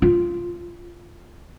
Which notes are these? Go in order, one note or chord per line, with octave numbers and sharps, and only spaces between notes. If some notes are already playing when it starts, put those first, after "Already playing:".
F4